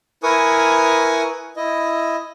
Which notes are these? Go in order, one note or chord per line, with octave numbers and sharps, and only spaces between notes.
E4 A#4 B4 G#5 C#6 D#6
E4 D#5